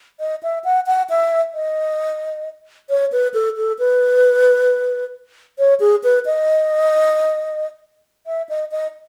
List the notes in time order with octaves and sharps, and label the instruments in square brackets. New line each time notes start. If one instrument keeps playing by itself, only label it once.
[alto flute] D#5
E5
F#5
F#5
E5
D#5
C#5
B4
A4
A4
B4
C#5
G#4
B4
D#5
E5
D#5
D#5